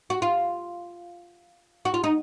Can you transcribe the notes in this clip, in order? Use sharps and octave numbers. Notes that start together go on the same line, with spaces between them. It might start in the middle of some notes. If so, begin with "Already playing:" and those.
F#4
F4
F#4
F4
D#4